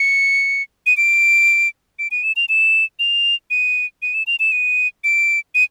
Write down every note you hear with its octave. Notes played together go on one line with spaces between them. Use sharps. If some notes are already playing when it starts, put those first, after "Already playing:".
Already playing: C#7
D#7
D7
D7
D#7
E7
F7
E7
F7
D#7
D#7
E7
F7
E7
D#7
D7
D#7